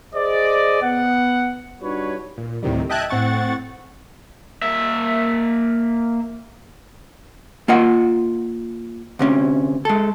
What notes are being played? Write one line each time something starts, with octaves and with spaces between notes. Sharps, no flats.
G#4 C5 D5 D#5
B3 F#5
G3 D4 D#4 F#4 B4 C#5
A#2
D2 A2 C3 D#3 G3
D#5 E5 G5 A5 F#6 G#6
A2 C4 F#5 C#6 A6
A#3 E5
A#3 F4 D#5 F#5
D2 C3 C#4
G#3 A4